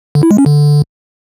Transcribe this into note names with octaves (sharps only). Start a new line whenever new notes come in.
D3
E4
G#3
C#4
D3